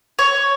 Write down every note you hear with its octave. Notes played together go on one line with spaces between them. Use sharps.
C#5